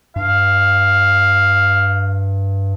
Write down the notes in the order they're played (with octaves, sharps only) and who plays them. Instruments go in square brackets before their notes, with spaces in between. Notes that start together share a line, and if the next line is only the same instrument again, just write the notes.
[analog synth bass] G2 [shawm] F5